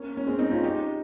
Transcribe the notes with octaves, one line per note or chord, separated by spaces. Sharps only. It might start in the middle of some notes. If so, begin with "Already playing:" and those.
Already playing: A#3 C#4
C#4
G#3 C4
C4 D#4
C#4 F4
D#4 G4